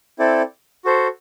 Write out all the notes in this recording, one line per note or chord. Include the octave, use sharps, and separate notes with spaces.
C4 E4 A4 D5
F#4 A4 C5